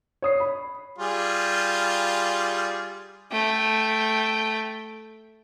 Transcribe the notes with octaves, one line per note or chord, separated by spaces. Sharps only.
C#5 D#6 C7
B5
G3 F4 G#4
A3 G5